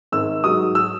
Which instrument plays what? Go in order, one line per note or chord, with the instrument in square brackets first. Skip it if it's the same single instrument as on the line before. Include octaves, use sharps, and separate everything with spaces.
[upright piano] G#1 E6
G#2 F#3 D#6
E6